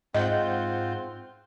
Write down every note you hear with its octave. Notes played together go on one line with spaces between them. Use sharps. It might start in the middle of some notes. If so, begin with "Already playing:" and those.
G#2 C4 F4 D#5 F#5 G6